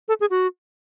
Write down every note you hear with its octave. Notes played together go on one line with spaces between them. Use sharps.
A4
G#4
F#4